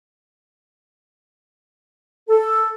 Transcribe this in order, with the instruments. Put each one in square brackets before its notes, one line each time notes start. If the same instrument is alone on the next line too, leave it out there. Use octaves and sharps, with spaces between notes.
[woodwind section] A4